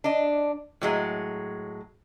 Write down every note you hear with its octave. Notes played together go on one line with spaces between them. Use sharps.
D4 D#5
A2 F#3 G#3